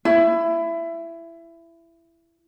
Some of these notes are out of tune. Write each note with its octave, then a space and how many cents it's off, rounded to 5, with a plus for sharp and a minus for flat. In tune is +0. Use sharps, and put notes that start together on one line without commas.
E4 +20